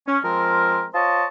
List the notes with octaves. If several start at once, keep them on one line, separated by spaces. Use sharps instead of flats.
C#4
F3 G#3 C4 A#4
F4 C5 C#5 D#5 A5